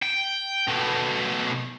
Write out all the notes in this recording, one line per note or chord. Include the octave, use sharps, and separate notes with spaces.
G5
B2 A3